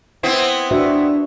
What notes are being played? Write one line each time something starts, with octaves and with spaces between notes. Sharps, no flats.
B3 C4 E4
D4 F#4 B4 E5